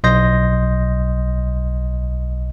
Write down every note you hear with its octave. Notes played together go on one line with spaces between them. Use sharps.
B1 D#5 C6 G6 A#6